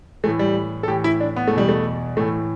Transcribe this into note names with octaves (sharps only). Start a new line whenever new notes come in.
A2 E3 A3
G3
A4
A2 E3 G4
E4
D4
B3
A3
E2 B2 G3
A3
A2 E3 A3